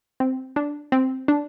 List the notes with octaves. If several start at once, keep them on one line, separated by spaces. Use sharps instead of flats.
C4
D4
C4
D4